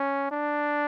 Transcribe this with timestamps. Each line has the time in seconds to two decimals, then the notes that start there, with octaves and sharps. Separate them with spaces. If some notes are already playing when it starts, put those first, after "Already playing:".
Already playing: C#4
0.31 D4